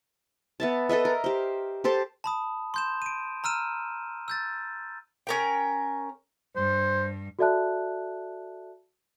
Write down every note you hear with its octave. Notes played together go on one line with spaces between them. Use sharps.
B3 E5 A5
A4 B4 D#5 E5
A#4
G4 C5
G4 A4 C5 A5
A5 B5 D#6
C6 G6 E7
D7 D#7
A#5 E6 F6 D#7 E7
E6 G6 A6
C#4 A#4 G5
G2 C5
F#4 A4 D5 E5 A5 F#6